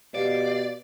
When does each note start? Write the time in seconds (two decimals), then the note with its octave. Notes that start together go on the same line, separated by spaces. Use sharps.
0.15 B2 G4 D5 F5